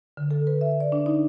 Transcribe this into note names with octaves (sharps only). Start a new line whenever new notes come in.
D3
A4
B4
E5
D5
D4
D#4